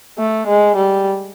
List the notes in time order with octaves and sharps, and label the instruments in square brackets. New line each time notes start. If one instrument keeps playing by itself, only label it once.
[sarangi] A3
G#3
G3